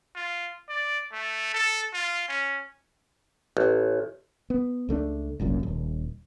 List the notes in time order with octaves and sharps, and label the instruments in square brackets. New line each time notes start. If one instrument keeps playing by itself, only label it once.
[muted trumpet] F4
D5
A3
A4
F4
C#4
[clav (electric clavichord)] A1
[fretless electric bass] B3
C#2 A3 A#3 D4
F1 C2 F#2 A#2
D#1